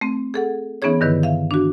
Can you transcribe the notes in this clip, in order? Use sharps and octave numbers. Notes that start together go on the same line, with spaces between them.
A3 C4
G#4 A4 F#5
E3 B3 C#4 D#4 G#4 C#5
G2 D3 D#3 E4 B4
E5 F5
D4 F#4